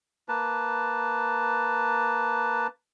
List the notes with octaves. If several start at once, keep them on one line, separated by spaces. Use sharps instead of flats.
A#3 B4 A5